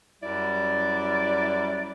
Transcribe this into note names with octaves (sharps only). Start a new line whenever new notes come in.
F#2 G3 E4 D5